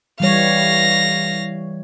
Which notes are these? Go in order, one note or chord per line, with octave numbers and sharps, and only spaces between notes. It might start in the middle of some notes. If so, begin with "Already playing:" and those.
E3 G3 C#5 F5 A#6